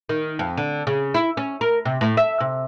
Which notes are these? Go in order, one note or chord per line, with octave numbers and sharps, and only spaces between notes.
D#3
F2
D3
C#3
E4
C#4
A#4
C3
A2
E5
C3